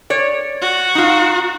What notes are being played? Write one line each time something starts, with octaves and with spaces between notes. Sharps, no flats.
C#5 D5
F#4
D#4 F4